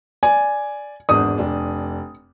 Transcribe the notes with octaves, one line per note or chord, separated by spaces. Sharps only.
D5 G#5
G#1 E2 D4 D#6
F1 D4